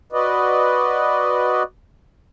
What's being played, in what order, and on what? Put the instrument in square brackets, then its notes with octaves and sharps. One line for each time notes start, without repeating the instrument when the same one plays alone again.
[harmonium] F#4 B4 D5 D#5